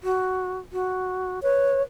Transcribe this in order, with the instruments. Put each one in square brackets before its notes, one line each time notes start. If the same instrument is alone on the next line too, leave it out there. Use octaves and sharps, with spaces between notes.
[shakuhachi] F#4
F#4
[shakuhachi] B4 [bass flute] C#5